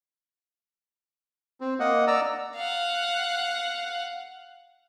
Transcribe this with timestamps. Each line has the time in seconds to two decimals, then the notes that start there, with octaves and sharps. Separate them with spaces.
1.61 C4
1.80 A#3 D#5 F#5
2.07 D5 A#5 E6
2.56 F5 F#5